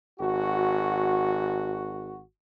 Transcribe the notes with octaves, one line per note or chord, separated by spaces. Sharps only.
G#1 F#4